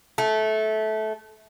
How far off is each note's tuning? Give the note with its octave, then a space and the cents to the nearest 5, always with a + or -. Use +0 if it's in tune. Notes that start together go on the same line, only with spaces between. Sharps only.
A3 -20